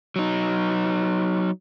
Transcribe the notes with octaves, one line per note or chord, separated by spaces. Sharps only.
F#3 D#4